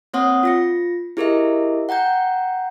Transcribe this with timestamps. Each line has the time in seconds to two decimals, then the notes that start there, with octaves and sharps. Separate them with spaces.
0.13 A#3 C4 C#5 F#5 C6 D#6
0.43 F4 A#6 C#7
1.17 E4 G4 G#4 A#4 D#5 E5
1.89 F#5 G5 A#5 G6